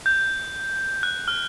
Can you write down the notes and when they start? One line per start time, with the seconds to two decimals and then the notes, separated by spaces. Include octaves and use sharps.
0.06 G6
1.03 F#6
1.28 F6